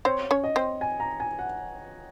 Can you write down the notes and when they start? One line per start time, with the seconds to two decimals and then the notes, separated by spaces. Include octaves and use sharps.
0.05 C4 C5 C#5
0.31 C#4 C#5
0.44 D#5
0.56 C4 C5
0.81 G#5
1.00 A#5
1.20 G#5
1.39 F#5